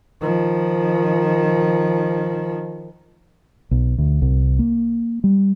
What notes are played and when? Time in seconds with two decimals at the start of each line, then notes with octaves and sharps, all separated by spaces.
0.21 D#3 F3
3.71 B1
3.98 D2
4.22 C2
4.59 A#3
5.24 G3